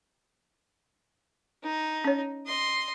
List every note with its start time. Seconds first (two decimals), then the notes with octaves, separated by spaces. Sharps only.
1.63 D#4
2.05 C#4 C#5
2.47 D#5 C6